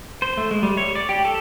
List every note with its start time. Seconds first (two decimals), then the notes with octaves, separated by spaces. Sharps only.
0.22 C5
0.37 A3
0.51 G#3
0.63 G3
0.77 C#5
0.95 D5
1.09 G4
1.25 A4